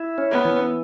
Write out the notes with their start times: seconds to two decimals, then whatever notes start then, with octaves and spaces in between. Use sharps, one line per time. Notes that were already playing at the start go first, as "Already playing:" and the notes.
Already playing: E4
0.18 C#4
0.31 B3
0.45 E3